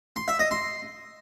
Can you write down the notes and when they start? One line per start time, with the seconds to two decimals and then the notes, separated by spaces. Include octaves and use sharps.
0.16 C6
0.28 E5
0.39 D#5
0.51 C6